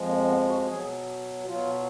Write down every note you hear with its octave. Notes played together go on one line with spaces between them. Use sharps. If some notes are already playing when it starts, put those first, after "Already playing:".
Already playing: F2 F3 G#3
A#3
B3
F#4
B2 F#3 G#4
B2 F#3 F4